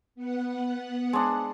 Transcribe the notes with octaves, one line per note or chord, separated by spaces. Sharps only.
B3 F#5
G#3 D4